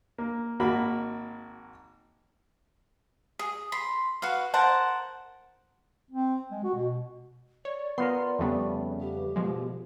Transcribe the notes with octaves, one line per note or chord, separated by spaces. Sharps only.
A#3
G#1 A#3 F#4 B5
G#4
B5 C6
F#4 B4 F5
A#4 C5 F#5 A5
C4
G#3
F#4
B2
C#5 D5
B3 F4 A#4 C6
F2 C#3 G3 A3 B3
G4
B2 F3 G#3